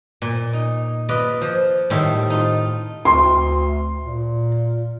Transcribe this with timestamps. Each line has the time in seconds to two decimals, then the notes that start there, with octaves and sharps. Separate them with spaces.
0.22 A#2
0.53 D#4
1.09 F4 B4 D5 D#5
1.41 F3
1.90 A2 D#3 G3 A4 C5 E5
2.30 D#4 F4
3.05 D2 C6
4.04 A#2